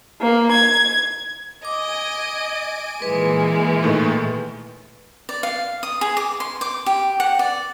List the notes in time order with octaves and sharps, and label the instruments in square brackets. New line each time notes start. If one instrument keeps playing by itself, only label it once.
[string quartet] A#3
G#6
[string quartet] D#5 [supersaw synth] G#5 D7 D#7 [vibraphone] D6
[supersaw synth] A#2 A#3 [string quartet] E3 G#3 [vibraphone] B4
[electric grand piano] A2 D#3 A3
[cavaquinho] D5
F5
D#6
G#4
D6
C6
D6
G4
F#5
D5